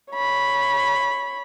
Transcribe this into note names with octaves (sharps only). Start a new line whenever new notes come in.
C#5 B5